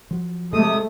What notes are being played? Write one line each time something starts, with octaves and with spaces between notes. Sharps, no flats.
F3 F#3
C3 G#3 A3 D#6